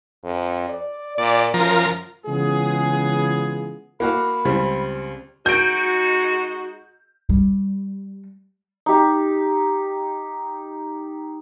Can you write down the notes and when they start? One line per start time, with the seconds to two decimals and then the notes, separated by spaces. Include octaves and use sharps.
0.24 F2
0.68 D5
1.18 A#2 D5
1.54 F#2 F3 A#4
2.27 C#3 E3 G#3 B3 F4 G#4
4.00 A#3 F#4 F5 B5
4.45 C#2 G3 C4
5.46 G#3 D#4 F#4 G6 D7
7.29 G3
8.86 D#4 G4